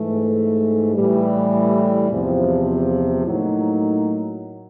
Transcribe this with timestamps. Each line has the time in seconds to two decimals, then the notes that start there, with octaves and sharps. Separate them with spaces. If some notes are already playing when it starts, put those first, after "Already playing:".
Already playing: G#2 E3 A3
0.94 A2 E3 G3
2.10 E2 C3 F3
3.26 A2 F#3 A#3 D#4